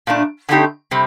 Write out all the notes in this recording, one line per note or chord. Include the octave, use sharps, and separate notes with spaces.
A#2 A3 D4
D3 A3 C4 D#4 G4
C3 G3 C4